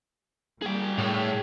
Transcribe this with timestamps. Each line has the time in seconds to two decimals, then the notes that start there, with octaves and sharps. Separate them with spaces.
0.62 G3 A#3 G#4 G5
0.98 A2